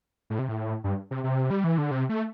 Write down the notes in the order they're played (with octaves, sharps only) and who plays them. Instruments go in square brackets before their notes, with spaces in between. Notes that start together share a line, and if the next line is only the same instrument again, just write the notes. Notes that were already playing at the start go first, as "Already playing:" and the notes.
[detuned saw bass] A2
C3
A2
G2
C3
C3
G3
E3
D3
C3
A3